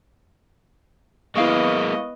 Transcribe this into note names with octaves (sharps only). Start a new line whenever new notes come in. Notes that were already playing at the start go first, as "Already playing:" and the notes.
G#3 A#3 B3 E4 D#5 F5 C#6